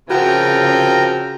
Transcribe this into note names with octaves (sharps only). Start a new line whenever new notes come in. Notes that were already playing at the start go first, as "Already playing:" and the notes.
C#3 F3 C4 F#4 A#4 G5 A#5